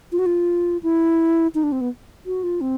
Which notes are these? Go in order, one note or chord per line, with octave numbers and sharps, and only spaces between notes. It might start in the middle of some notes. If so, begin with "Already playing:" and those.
F4
F#4
F4
E4
D#4
D4
C4
B3
F#4
F4
C4